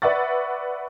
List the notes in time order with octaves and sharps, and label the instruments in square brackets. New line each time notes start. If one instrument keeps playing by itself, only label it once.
[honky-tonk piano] B4 D5 E5 F#5 C#6 A6